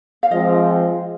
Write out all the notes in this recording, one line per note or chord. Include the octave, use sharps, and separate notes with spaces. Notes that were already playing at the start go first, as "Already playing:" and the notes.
F5
F3 G#3 C4 F4 D#5